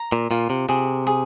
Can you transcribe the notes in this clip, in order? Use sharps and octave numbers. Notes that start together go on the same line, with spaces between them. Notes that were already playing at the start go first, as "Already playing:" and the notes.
Already playing: A#5
A#2
A#2 F4
C3
C3 G#4
G#4